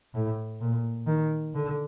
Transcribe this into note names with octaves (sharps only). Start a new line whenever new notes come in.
A2
A#2
D#3
D3